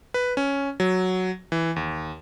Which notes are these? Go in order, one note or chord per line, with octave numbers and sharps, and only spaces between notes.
B4
C#4
F#3
E3
D#2